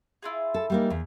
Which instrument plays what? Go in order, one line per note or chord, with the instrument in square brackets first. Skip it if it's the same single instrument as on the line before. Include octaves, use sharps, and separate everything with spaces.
[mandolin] E4 F4 G#4
[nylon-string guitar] A4
G3 A#3 D#4
E2